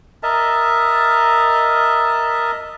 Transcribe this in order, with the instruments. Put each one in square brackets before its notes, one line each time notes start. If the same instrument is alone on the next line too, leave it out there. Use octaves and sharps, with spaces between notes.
[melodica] A#4 D#5 E5 A5